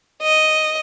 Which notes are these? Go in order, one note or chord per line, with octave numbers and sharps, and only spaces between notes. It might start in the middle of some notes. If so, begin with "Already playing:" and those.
D#5